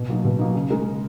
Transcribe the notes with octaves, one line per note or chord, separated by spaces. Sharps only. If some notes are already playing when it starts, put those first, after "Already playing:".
Already playing: B2
F#3 A#3 D#4
B2
F#3 A#3 D#4
C#3
G#3 D#4 A#4
C#3